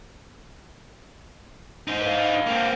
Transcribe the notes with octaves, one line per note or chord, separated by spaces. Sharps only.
D#4 C5
B4 F5
A#3 C4